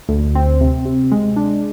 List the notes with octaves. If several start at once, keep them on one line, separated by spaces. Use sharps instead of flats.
D2
C4
C3
C3
G#3
D4